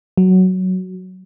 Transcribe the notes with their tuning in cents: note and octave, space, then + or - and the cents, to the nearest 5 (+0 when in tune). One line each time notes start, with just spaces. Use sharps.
F#3 +5